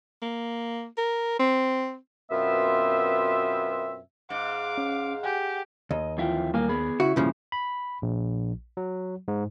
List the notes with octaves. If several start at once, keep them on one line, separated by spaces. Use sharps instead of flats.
A#3
A#4
C4
F#2 B2 B3 C4 F4 E5
G#2 F5 D6
C#4
G4 F#5 G#5
D#2 D#5
F2 E3 F4 E5 G5
G3 A#3 G#5
B3 G#4 B5
C#3 E4 F#4
G2 A#2 C#3 F3
B5
A#1
F#3
G#2